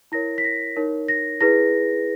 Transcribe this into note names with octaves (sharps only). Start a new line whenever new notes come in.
E4 A#4 C#5 A#6
B6
A#6
D#4 A#4 C#5
A#6
E4 G#4 B4 A#6